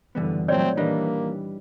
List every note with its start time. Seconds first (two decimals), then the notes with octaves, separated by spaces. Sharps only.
0.15 F#1 D3 E3 G3 B3
0.48 A#2 F#3 A3 C4 C#5 D5
0.77 A#2 D#3 E3 G3 A#3 D4 D#5